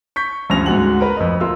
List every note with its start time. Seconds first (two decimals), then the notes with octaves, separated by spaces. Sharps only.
0.16 C#6 G6 B6
0.50 D2 G2 F3 C#4 A#6 F7
0.66 D2 G#2 F#4 F#7
1.00 A#4 B4 B5
1.17 F2 D#5
1.40 D2 F4 A#4 E6